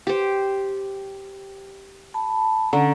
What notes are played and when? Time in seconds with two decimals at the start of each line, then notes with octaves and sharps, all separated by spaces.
0.07 G4 C5
2.14 A5 B5
2.73 D3 C#4 D5 A#5